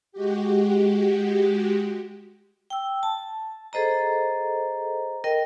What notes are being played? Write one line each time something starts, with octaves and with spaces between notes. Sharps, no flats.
G#3 F#4 G4
G5 E6
A5
G#4 A4 C5 D#5 A#5
A#4 D#5 G5